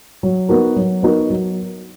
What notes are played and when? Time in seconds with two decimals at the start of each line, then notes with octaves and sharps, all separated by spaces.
0.23 F#3
0.49 B3 D#4 F#4 A#4
0.76 F#3
1.03 B3 D#4 F#4 A#4
1.30 F#3